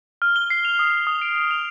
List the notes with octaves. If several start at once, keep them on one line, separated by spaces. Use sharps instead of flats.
F6
G7
C7
F7
D#6
D#6
D#6
D7
D7
F7